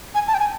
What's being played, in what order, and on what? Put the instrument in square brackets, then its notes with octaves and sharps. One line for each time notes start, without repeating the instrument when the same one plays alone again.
[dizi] G#5
A5
G5
G#5